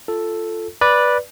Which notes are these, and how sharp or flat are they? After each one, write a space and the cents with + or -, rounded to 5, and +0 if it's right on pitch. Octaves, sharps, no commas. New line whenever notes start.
F4 -10 A4 +0
B4 -10 D5 +0